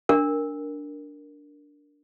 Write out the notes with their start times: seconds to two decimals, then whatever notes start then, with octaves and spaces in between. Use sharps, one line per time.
0.09 D4 A#4